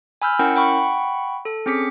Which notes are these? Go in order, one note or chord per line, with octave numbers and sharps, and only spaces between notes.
G#5 B5 E6 F6 G6
C#4 E4 A#4 F#5 G5
F#5 G5 B5 C#6
A4
C4 C#4 G#4 D6 B6 C#7